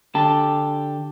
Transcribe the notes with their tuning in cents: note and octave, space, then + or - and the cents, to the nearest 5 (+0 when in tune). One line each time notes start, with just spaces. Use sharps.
D3 +0 G4 +0 A5 +0